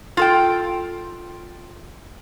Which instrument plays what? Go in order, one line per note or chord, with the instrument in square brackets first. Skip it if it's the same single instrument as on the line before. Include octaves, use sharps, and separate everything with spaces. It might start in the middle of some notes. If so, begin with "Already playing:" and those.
[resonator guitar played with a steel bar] F4 A4 G5